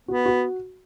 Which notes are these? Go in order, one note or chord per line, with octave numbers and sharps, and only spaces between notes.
B3 F#4
F#4